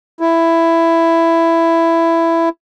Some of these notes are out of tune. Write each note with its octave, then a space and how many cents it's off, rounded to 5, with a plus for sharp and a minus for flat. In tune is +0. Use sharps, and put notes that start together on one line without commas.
E4 +10